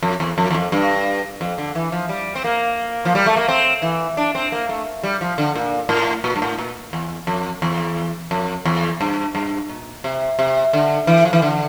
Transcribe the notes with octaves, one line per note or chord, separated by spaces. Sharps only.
F2
E2
F2
E2
F2
G2
F2
D3
E3
F3
G3
C4
A#3
F3
G3
A3
A#3
C4
E3
D4
C4
A#3
A3
G3
F3
D3
A#2
A2
A#2
G2
A2
A#2
E2
F2
E2
F2
E2
G2
G2
A#2
C3
C3
D3
E3
F3
E3
D3